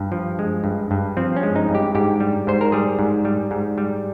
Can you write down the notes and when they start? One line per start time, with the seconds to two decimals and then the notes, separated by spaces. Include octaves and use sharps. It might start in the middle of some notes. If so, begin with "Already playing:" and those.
Already playing: G2
0.12 F3
0.39 G#3
0.64 G2
0.91 G2
1.17 F3 C4
1.36 C#4
1.43 G#3
1.56 D#4
1.69 G2
1.75 G4
1.95 G#2 G4
2.20 G3
2.47 G#2 C5
2.61 A#4
2.72 G3 G#4
2.99 G#2
3.25 G3
3.51 G#2
3.78 G3